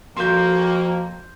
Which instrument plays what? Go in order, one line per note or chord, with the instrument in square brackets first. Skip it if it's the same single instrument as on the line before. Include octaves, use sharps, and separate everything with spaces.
[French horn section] F2 A#3 [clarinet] F3 [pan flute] F#4 [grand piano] C6 G6